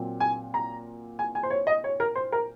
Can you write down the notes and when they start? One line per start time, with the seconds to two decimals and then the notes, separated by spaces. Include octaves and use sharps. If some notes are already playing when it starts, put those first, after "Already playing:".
Already playing: A#2 F#3 C4
0.20 G#5
0.54 A#5
1.19 G#5
1.35 G#5
1.43 C5
1.50 C#5
1.67 D#5
1.84 C#5
2.00 A#4
2.15 C5
2.32 A#4